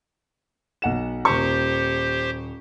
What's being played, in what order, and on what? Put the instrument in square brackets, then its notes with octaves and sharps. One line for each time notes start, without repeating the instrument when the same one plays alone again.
[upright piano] B1 F#5 E7
[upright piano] D#1 C#6 [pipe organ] G4 C5